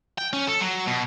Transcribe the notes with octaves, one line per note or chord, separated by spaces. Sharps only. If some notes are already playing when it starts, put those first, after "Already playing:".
G5
C#4
A4
F#3
B2